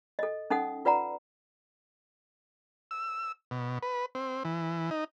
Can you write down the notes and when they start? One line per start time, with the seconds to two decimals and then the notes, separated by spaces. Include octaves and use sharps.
0.19 A4 D#5
0.50 C#4 D#4 A4 F#5 D#6
0.85 F4 B4 D5 F#5 A#5
2.91 E6
3.51 B2
3.83 B4
4.15 C4
4.45 E3
4.91 D#4